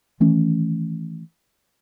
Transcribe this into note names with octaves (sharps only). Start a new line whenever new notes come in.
D#3 E3 A3 C#4